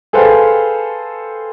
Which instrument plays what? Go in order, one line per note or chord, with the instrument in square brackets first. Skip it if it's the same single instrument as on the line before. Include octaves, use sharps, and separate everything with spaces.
[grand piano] G#4 A4 B4 C5 F5 G5